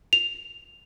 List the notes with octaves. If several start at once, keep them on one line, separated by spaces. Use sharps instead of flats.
F7